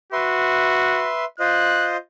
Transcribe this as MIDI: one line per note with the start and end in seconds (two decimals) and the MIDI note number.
0.13 1.11 66
0.13 1.25 71
0.13 1.25 76
0.13 1.25 84
1.40 1.97 65
1.40 1.97 72
1.40 1.97 75
1.40 1.89 90